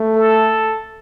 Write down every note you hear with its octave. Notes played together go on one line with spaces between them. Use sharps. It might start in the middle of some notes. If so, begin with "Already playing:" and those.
Already playing: A3
A4